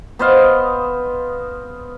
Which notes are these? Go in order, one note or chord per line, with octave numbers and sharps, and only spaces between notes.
B3 C5 D#5 F5